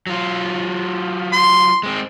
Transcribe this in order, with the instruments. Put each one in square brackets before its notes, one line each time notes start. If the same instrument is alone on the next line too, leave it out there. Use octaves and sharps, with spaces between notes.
[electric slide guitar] F#3 F4
[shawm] C6
[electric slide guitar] G#3 C4